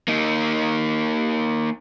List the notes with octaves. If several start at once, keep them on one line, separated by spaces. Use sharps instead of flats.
A#3 D#4